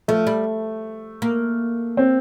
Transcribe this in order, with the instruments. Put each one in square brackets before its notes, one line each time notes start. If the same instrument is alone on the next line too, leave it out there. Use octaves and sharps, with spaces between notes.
[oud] F3 [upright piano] A3
[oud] G3
A#3
[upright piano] C4